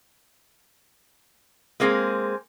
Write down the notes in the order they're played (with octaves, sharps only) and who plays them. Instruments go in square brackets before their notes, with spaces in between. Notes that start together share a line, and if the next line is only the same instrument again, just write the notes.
[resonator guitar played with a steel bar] G#3 A#3 C4 G#4